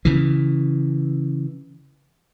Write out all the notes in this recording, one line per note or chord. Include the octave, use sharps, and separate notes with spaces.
C#3 E3